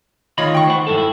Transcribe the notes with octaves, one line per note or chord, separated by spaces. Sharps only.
D2 D#3 F4 C#5 D#5 B5
G5 C#6
C5 F#5
G2 E4 A4
E4